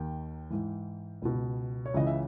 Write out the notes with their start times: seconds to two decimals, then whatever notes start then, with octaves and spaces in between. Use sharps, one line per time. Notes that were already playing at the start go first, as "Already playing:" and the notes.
Already playing: D#2 D#3 G5
0.50 G#2 E3
1.22 C#2 B2
1.86 C#5
1.94 C#2 C#3 E3 D#5
2.06 E5